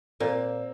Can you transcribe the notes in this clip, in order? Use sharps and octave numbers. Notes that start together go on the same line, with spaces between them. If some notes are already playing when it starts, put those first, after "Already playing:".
A#2 A#3 C4